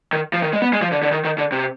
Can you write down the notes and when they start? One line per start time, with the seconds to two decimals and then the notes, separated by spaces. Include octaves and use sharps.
0.13 D#3
0.33 F3
0.42 D#3
0.53 G#3
0.62 B3
0.73 G#3
0.82 F3
0.92 D3
1.03 D3
1.12 D#3
1.25 D#3
1.38 D3
1.52 C3